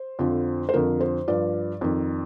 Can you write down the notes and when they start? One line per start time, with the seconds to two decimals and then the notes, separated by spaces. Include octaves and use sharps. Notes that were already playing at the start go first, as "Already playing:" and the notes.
Already playing: C5
0.19 F2 D3 F3
0.69 C5
0.74 F2 D3 F3 A#4
1.01 C5
1.28 G2 F3 D5
1.81 F2 D#3